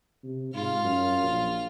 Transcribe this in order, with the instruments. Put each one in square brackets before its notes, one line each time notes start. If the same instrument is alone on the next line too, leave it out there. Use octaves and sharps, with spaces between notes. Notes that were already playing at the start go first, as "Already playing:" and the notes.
[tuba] C3
[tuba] G#2 [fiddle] F4 F6
[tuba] F#2
A#1